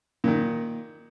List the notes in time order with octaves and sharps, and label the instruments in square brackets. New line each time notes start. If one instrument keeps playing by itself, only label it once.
[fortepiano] A#2 D#3